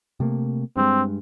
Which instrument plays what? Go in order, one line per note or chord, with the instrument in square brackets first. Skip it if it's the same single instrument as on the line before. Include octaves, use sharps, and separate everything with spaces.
[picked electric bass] C3 A3 A#3
[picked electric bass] G2 G#3 [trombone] C4